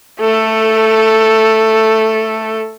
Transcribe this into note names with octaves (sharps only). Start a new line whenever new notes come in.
A3 A4